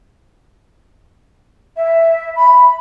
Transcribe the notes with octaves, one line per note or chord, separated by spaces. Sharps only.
E5
B5